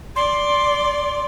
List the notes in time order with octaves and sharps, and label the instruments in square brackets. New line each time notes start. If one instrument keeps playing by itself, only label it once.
[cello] D5 [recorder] C6